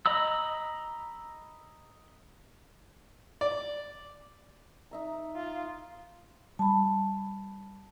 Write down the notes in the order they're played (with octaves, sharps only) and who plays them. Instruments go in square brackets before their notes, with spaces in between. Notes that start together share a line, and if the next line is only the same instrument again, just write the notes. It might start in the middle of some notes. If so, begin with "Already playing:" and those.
[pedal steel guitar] D#5 A#5 B5 E6
[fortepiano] D5
[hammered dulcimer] D#4 E5 A#5
[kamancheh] F4
[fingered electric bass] G3 [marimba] A5 B5